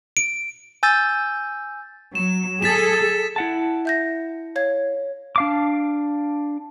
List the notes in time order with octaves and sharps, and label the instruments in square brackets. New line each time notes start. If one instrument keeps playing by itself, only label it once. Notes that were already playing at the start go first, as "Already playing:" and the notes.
[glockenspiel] D7
[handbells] G#5 E6 G6 A6
[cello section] F#3 [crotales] E7
[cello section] G#4 A4 [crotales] A6 B6 E7
[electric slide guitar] E4 F#5 A5
[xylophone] E5 G6 A#6
C#5 F5 G#6
[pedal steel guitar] D4 F5 D6